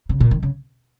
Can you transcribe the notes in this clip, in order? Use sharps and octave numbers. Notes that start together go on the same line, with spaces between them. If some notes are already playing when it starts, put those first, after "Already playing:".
C#3
A#2
D#3
C#3